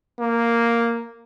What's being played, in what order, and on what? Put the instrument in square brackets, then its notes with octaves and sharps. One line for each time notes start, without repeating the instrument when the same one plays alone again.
[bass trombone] A#3